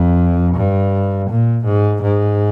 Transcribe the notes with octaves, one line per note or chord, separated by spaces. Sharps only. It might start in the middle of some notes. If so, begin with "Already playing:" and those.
Already playing: F2
G2
A#2
G#2
G#2